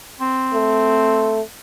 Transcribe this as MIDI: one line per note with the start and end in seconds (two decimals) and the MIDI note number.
0.20 1.45 60
0.53 1.41 57